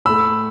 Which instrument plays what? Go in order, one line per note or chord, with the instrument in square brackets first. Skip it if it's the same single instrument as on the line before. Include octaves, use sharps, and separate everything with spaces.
[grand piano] A2 A3 B5 E6